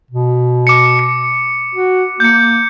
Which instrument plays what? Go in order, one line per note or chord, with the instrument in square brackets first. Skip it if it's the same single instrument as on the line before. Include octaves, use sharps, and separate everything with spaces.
[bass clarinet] B2
[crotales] D6 C#7
C#7
[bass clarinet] F#4
[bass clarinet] A#3 [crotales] G6 C#7